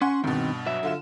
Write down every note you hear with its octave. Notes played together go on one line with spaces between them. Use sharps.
C#4 F#5 G#5 C6
G2 B2 D#3 C4
F#3 E5
D3 F4 E7